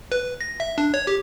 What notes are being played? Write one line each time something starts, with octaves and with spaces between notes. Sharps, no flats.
B4
A#6
E5
D4
C#5
G4